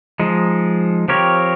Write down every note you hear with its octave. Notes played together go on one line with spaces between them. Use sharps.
F3 G#3 D#4
F3 C4 G4 A#4 C#5